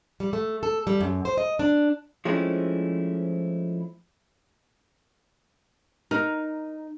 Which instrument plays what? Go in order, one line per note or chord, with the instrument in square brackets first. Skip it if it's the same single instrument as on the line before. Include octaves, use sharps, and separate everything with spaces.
[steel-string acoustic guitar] G3
A3
A4
G3
F#2
C5
D#5
D4
[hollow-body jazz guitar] F3 G#3 A3 C4 C#4 E4
[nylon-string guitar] D#4 [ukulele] A#4